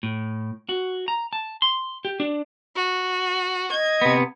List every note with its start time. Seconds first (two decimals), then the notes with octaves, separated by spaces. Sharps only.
0.03 A2
0.69 F#4
1.08 A#5
1.33 A5
1.62 C6
2.05 G4
2.20 D4
2.76 F#4
3.72 D#5 G#6
4.02 C3 B3